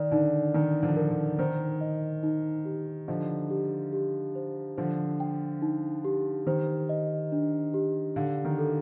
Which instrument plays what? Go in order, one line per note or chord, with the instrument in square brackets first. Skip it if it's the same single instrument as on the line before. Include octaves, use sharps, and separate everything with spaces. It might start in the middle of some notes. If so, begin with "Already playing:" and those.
Already playing: [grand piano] D#3 [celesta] D5
[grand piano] D3 [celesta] D#4
[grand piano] D#3 [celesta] D#4
[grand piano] D3 F3
[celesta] A#4
[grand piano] D3
[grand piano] D#3 [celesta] C5
[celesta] D#5
D#4
G4
[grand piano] D3 F3 [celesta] D#5
[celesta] G4
G4
C5
[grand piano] D3 F3 [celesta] C5
[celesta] G5
D#4
G4
[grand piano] D#3 [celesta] C5
[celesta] D#5
D4
G4
[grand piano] D3 [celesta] F5
[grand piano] D#3
[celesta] A4